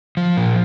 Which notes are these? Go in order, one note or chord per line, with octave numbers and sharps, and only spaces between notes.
F3
A#2